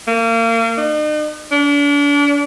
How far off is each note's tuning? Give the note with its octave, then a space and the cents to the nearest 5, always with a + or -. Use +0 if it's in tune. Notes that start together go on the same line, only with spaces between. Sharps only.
A#3 -35
D#4 -45
D4 -35